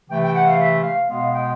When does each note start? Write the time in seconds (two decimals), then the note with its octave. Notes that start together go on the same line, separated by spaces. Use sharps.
0.09 C3 E3 A3 G5
0.21 G5
0.34 F#5
0.46 F5
0.59 E5
0.83 F5
1.08 B2 G#3 B3 F5
1.33 G5